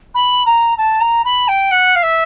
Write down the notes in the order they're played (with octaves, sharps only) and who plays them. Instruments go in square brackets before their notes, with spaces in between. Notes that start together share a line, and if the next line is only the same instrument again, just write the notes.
[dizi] B5
A#5
A5
A#5
B5
G5
F#5
F5
E5